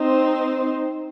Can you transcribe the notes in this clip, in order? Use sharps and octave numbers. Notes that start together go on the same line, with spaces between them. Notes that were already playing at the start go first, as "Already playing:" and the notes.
Already playing: C4 D#4 C5